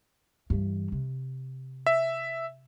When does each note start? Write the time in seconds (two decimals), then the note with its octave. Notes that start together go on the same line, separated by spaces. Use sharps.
0.50 G2 E3
0.92 C3
1.86 E5